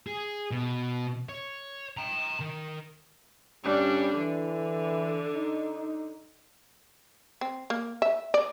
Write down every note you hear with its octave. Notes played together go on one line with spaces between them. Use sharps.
G#4
B2
C#5
G5 A#5
D#3
G1 G2 G3 C#4 D4
D3 E3
D#4
C4
A#3
E5
D5